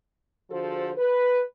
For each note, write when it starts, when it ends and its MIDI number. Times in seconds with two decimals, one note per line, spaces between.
0.51 0.91 50
0.51 0.91 53
0.51 0.91 66
0.51 0.91 68
0.51 0.91 69
0.51 0.91 72
0.97 1.42 71